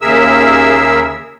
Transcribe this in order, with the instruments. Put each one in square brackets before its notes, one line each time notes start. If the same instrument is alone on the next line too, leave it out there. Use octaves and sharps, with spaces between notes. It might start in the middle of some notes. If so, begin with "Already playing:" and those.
[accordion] D#2 C#3 G#4 A#4 E5 E6